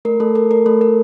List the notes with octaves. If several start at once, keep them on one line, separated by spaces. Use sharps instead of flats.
A3 A#4
A3 A4
A4 A#4
A3 A#4
A3 A4
A4 A#4